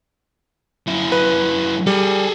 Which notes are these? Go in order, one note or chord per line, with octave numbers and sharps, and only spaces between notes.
F#2 E4
B4
G3 G#4 A4